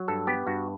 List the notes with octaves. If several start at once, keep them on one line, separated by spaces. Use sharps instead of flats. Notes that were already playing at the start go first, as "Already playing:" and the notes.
Already playing: F#3
G2 A4
B3 G4
G2 F#4